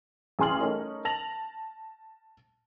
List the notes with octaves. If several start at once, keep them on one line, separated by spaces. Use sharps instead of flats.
A1 G#4 G#5 C6 F6 F#7
A3 C#4 D#4 A#4
A5 A#6 F7 F#7